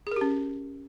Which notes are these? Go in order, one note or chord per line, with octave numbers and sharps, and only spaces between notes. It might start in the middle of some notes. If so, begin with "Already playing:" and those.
C#4 G4 G#4 A#4